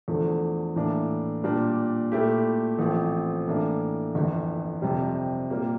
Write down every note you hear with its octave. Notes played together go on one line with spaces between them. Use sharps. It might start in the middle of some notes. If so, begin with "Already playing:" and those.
E2 D3 F3 A3
A2 E3 A#3 D4
A#2 G3 D4
A#2 A3 E4 G4
A1 A2 F3 C4
A2 E3 A#3 D4
G1 F2 E3
F2 C3 G3 C4
A#2 G3 A#3